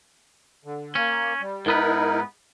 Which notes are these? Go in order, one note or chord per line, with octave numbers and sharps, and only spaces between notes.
D3
A#3 C#4
G3
G#2 B3 D#4 E4 A#4 B4